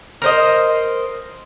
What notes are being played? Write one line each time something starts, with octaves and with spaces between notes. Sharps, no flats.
A#4 C5 D#5